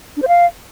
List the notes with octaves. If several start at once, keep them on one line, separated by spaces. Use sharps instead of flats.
D4
C5
F5